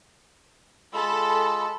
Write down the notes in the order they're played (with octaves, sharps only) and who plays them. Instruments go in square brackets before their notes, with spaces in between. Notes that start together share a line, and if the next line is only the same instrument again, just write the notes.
[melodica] G#3 F4 E6 [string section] A4 A5 B5